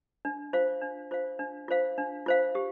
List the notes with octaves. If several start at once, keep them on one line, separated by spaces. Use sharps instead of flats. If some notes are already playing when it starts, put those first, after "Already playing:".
D4
F4 C5 F5
D4
F4 C5 F5
D4
F4 C5 F5
D4
F4 C5 F5
G4